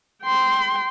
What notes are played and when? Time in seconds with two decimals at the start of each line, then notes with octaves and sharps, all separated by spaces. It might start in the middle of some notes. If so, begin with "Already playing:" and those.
0.23 G5 C6